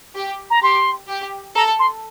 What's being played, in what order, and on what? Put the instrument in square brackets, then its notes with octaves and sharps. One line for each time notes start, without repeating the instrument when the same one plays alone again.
[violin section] G4
[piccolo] A#5
[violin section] G4 [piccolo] C6
[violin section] G4
[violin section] A4 [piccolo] A#5
[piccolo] C6